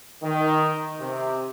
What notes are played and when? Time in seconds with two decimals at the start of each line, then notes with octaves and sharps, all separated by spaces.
0.22 D#3
1.00 C3